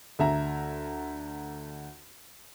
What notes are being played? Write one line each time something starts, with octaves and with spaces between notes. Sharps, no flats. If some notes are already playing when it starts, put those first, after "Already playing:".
D2 E5 A#5